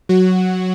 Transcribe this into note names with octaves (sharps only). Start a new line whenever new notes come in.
F#3 F#4